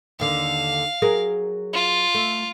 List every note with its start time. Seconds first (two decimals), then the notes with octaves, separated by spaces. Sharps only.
0.20 D#2 D3 F5
1.02 F#3 G#4 A#4
1.74 F4
2.14 A3